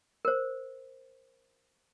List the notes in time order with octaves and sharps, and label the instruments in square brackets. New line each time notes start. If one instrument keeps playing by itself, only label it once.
[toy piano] A#4 C5